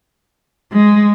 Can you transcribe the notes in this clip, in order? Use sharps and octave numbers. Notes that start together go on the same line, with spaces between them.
G#3